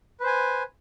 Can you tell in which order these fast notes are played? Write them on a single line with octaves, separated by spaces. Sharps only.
B4 C5 G#5